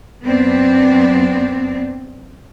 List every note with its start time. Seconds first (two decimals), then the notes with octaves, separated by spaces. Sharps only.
0.23 F#2 B3 C4 D4